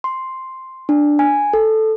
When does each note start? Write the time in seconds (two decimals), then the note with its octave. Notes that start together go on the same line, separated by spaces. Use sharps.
0.04 C6
0.89 D4
1.19 G#5
1.53 A4